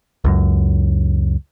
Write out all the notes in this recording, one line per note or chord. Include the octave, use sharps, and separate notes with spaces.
C#2 F#2